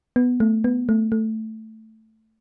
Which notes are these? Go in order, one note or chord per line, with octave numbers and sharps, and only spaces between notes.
B3
A3
B3
A3
A3